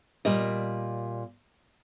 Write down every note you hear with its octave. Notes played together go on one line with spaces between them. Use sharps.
A#2 G3 A#4 D#5